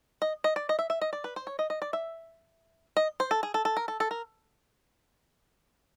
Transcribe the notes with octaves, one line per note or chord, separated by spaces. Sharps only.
D#5
D#5
D5
D#5
E5
E5
D#5
D5
B4
C5
C#5
D#5
D#5
D5
E5
D#5
C5
A4
G#4
A4
A4
A#4
A4
A4
A#4